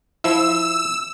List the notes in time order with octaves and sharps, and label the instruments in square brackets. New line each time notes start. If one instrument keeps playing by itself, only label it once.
[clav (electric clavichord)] F3 E4 [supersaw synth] E6